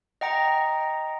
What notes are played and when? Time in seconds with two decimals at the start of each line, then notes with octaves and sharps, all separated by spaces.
0.21 D#5 F#5 G5 A#5 A#6